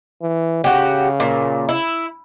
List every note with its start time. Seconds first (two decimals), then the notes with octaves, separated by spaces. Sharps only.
0.22 E3
0.64 C#3 F#4 G4
1.20 A#2
1.69 E4